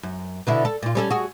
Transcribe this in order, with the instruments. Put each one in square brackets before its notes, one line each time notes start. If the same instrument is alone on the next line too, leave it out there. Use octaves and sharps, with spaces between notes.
[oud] F#2
B2 D3 E4
A4
A#2 F4
G3 C#4 A4
F#4 G#4